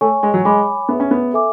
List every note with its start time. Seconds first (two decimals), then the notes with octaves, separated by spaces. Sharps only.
0.01 A3 C#5 G#5 C#6
0.23 G#3
0.34 F#3
0.45 G#3 C#5 G#5 B5 D6
0.89 B3 G#4 C#5 E5
1.00 C#4
1.11 B3
1.34 A4 E5 G#5 D6